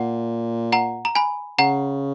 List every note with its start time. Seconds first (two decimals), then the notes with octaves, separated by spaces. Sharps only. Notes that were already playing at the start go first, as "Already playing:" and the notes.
Already playing: A#2 F#5
0.72 F#5 A#5
1.05 A#5
1.15 G#5 B5
1.59 C#3 F#5 A#5